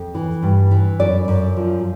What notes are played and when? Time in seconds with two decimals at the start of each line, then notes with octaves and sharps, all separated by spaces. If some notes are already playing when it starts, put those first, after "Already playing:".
Already playing: F2
0.15 E3
0.43 G2
0.71 E3
1.00 F#2 D5
1.28 F#2
1.57 F3